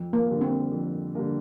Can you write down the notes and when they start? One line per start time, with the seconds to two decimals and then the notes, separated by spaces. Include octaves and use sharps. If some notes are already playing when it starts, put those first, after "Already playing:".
Already playing: F2
0.13 A#3
0.27 D3 G3 A#3
0.41 C4
0.71 F2
1.15 D3 G3 A#3